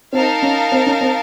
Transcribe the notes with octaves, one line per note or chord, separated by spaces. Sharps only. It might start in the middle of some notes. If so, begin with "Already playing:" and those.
C4 D#4 A#4 F5 A5
C#4
C4
C#4
C4